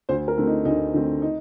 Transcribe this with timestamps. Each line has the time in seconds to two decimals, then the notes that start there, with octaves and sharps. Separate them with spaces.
0.09 D2 C5
0.28 A#4
0.37 D3 A3 C4
0.47 D#4
0.65 D2 D#4
0.94 D3 A3 C4
1.22 D#4